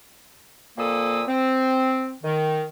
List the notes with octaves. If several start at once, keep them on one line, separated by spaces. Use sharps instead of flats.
F2 A#2 A#3 A4 D#6 E6
C4
D#3